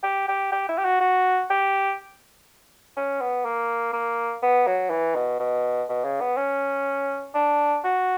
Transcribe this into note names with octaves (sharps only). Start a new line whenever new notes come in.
G4
G4
G4
E4
G4
F#4
F#4
G4
C#4
B3
A#3
A#3
B3
F#3
E3
B2
B2
B2
C#3
B3
C#4
D4
F#4